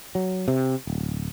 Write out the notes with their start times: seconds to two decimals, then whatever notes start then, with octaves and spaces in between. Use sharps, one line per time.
0.15 F#3
0.48 C3
0.87 D1